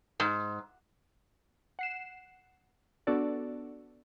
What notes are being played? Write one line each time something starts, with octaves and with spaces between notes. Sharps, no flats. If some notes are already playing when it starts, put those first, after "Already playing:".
G#2
F#5 C7 E7
B3 D4 F#4 A4 D5